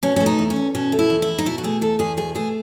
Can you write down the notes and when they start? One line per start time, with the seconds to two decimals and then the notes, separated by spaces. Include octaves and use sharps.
0.03 B2 C#4
0.16 A3 C#4
0.26 D#4
0.39 E2
0.50 C#4
0.56 E2
0.75 B2 C#4
0.92 A3
0.99 E4
1.10 E2
1.22 E4
1.28 E2
1.38 D#4
1.46 B2 E4
1.58 F#4
1.64 A3 G#4
1.81 E2 A4
1.99 E2 G#4
2.17 B2 G#4
2.35 A3 G#4